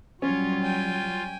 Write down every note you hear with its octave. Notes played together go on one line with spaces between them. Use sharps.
F#3 G3 C#4 F4 C#5
G5 G#5